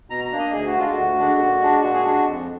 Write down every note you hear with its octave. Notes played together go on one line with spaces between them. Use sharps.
B2 A#5
A#5
A#3 D4
D#5
D2 G#4
F#4
D3 G#3 D4 F4
D2 F#4
D3 G#3 D4
A#2
G#3 D4
A#2 F#4
G#4
G#3 D4 F#4
F2